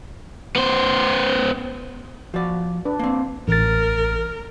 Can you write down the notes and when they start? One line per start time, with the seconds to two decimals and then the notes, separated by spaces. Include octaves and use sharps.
0.56 B3 C5
2.34 F3 F#4 D5
2.85 D4 B4
2.99 A#3 C4
3.48 A1 A#4 A6